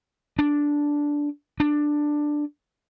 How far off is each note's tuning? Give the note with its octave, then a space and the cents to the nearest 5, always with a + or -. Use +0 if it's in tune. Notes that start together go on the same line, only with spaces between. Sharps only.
D4 -5
D4 +10